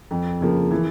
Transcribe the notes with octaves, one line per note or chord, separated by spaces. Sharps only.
F2
C#3 F3 A#3
E3